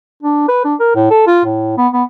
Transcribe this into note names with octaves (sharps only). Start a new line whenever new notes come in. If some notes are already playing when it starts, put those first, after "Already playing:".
D4
B4
D4
A#4
A2
A4
F4
A2
B3
B3